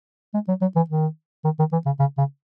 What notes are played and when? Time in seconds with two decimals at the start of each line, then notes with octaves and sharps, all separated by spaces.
0.34 G#3
0.48 F#3
0.61 F#3
0.76 E3
0.90 D#3
1.45 D#3
1.59 D#3
1.72 E3
1.86 C#3
1.99 C#3
2.18 C#3